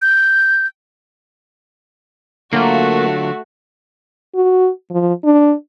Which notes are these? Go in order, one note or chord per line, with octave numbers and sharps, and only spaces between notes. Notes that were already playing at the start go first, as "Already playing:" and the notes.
G6
D3 F#3 A3 A#3 F4 F#4
F#4
F3
D4